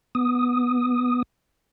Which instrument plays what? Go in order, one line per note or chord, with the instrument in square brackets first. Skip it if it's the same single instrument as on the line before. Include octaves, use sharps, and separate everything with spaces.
[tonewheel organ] B3 D#6